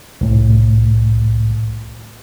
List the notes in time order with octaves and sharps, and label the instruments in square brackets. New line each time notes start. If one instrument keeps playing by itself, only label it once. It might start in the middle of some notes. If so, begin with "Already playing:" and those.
[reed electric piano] C2 A2